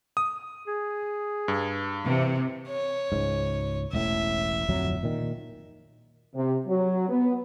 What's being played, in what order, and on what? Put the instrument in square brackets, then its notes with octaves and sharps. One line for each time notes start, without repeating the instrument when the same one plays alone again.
[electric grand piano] D#6
[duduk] G#4
[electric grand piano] G2
[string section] C3 [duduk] E3
[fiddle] C#5
[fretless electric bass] C#2 G#2
[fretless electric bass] E1 A1 A2 [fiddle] E5
[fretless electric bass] D1 F2 F#3
A#2 D#3
[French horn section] C3
F#3
B3